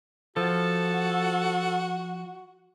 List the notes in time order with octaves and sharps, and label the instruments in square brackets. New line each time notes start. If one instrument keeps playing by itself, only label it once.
[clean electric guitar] F3 [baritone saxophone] F#4 [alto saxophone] A4